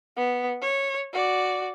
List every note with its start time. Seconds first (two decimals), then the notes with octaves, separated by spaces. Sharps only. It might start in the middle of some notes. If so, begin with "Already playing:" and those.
0.17 B3
0.62 C#5
1.13 F#4 D5